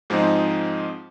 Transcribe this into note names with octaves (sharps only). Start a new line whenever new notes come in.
G#2 F3 G#3 C4 D#4